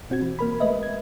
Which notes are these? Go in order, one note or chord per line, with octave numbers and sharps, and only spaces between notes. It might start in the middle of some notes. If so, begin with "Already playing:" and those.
B2 C4 F#4 G#6
E3
A#3 A#4 B5
G#3 A3 B4 D#5 E5
G#6